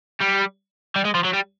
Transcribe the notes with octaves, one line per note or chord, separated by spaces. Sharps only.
G3
G3
G#3
F3
F#3
G3